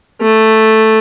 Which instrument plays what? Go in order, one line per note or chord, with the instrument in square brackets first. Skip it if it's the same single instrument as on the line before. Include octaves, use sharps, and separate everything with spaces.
[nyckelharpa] A3